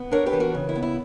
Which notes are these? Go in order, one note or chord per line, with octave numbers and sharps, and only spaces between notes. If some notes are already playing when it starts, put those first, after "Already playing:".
Already playing: B3
D4 A#4 C#5
G4 B4
E3
F#4 A#4
C#3
E4
B3
E4